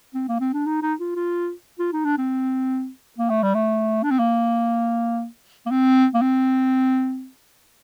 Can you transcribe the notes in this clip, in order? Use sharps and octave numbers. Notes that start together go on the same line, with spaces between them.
C4
A#3
C4
D4
D#4
D#4
F4
F4
F4
D#4
D4
C4
A#3
A3
G3
A3
D4
C4
A#3
A#3
C4
A#3
C4